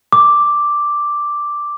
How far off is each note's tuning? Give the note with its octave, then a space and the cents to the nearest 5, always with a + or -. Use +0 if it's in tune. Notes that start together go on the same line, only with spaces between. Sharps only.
D6 +0